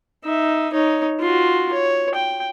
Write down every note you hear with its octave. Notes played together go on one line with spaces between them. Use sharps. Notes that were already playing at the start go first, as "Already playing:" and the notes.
D#4 E5
D#4 C#5
F4 F#4
C#5
G5